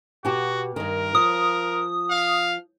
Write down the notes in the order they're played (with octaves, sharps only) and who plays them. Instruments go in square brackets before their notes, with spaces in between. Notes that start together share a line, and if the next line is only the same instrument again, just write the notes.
[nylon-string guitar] B2 G4 [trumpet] F#4
[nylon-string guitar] G2 D#3 [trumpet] A#4
[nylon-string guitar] F3 [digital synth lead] D#6
[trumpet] F5